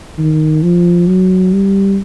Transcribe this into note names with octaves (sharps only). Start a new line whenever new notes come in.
D#3
F3
F#3
G3